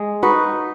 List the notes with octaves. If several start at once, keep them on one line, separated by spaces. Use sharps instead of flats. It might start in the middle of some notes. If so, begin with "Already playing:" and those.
Already playing: G#3
D#4 F#4 B4